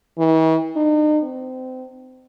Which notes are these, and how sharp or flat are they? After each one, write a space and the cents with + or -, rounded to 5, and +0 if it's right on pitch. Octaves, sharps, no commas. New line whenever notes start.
E3 -45
D#4 -40
C4 -25